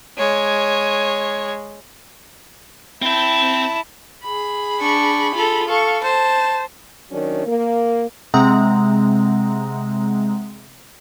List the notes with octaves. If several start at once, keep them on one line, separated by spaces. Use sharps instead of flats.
G#3 C#5
C4 E4 G5 A5
G#4 B5
D4 C#6
F4 A4
A4 F5 C#6
C5 A5
D#3 F#3 C#4 D4
A#3
C3 G#3 C4 F#5 A#5